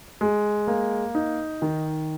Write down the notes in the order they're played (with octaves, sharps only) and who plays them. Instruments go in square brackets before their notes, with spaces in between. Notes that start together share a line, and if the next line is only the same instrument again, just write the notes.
[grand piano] G#3
A#3
D#4
D#3